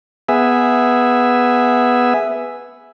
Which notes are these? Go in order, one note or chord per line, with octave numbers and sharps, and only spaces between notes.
B3 G#4 E5